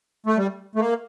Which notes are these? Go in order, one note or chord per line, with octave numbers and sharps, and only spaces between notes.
A3
G3
A3
A#3